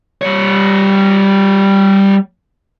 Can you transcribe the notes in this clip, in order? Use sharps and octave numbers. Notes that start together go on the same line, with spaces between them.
G3 C#5